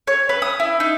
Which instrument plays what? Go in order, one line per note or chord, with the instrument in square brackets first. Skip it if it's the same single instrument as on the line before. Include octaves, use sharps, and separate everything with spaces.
[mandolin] C#5
B4
D#6
E4
D#4